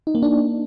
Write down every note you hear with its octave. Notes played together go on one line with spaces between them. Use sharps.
D#4
A#3
D4